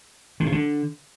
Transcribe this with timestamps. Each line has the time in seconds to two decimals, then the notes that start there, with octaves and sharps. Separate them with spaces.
0.40 D3
0.46 C3
0.52 D3